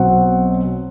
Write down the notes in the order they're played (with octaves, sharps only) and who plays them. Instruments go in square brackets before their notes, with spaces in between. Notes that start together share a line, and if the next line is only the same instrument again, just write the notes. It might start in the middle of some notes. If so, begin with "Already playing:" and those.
Already playing: [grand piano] B1 B2 F#3 C4 F#5